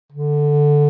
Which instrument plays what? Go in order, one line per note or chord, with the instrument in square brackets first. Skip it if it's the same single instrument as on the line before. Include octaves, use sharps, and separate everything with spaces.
[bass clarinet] D3